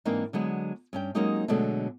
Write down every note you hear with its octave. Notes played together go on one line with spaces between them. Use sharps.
G#2 E3 A#3 C4 D4 D#4
D3 F#3 G#3 B3
G2 C#4 G5
F#3 G#3 A#3 C#4 D#4 G4
B2 D3 F#3 G#3 A3 D4